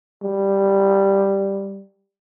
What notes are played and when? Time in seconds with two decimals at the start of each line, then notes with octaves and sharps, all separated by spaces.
0.23 G3